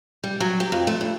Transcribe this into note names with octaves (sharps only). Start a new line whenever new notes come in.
G3
F#3
G4
F2
A3
G2